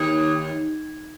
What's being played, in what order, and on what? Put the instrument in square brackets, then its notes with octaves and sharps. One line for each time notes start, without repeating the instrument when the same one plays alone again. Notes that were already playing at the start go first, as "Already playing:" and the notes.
Already playing: [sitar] D#2